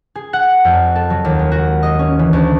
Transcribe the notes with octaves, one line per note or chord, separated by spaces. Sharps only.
G#4
F#5
F2
A4
F#3
D#2
G#3
F#4
D#5
C#4
E3
D2